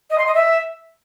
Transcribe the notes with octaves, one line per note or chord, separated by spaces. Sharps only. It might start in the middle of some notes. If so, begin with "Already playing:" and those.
D#5
C6
D#5
E5